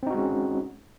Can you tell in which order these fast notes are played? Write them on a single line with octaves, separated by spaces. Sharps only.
C4 D#4 F#4 G#3 C#4